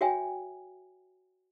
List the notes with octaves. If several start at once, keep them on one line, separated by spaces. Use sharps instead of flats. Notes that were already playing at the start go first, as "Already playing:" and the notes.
F#4 C#5 E5 G5 G#5